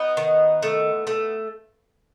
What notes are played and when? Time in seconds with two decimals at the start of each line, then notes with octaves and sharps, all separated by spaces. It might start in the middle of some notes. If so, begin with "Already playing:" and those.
Already playing: B3 D#4
0.17 D#3
0.63 A3
1.07 A3